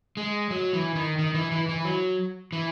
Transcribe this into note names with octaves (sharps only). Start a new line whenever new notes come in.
G#3
F#3
E3
D#3
D#3
E3
E3
E3
F#3
E3